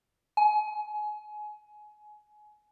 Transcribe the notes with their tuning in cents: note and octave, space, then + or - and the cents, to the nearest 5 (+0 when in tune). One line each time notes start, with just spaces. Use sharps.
G#5 +25